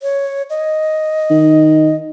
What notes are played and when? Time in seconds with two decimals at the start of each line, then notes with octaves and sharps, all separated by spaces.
0.03 C#5
0.50 D#5
1.30 D#3